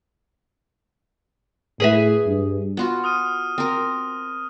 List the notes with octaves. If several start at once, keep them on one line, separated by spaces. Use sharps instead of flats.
A2 G#4 B4 E5
G2
B3 F4 F#4
D#6 F6 D#7
C4 A#4